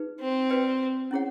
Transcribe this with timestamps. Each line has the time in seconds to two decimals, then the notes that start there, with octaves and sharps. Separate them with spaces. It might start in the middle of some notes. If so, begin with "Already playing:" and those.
Already playing: D#4 G#4 B4
0.20 C4
0.50 F#4 B4 D5 G5
1.11 C#4 E4 G#4 C#5 F#5